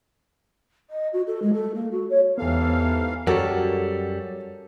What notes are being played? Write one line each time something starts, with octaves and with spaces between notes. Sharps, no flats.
D#5
F#4
A4
G#3
A4
A#3
F#4
C#5
E2 G#2 E3 B3 E4 G4 A4 F5
F#2 F#3 G3 G4 A4 A#4 C#5